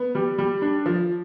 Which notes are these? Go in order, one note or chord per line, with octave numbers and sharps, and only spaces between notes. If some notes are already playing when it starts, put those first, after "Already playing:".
Already playing: B3
G3
G3
D4
F3